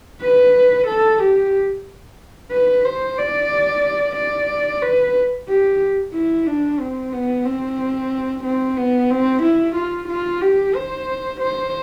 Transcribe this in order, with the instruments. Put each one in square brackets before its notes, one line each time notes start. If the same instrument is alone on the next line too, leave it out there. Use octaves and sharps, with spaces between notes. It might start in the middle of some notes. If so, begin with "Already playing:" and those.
[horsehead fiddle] B4
A4
G4
B4
C5
D5
D5
B4
G4
E4
D4
C4
B3
C4
C4
B3
C4
E4
F4
F4
G4
C5
C5